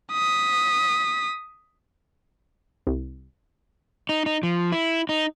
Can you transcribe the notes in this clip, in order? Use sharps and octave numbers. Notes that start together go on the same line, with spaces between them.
D#6 B6
C2
D#4
D#4
F3
E4
D#4